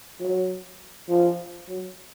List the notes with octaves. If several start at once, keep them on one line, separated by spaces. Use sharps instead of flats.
F#3
F3
F#3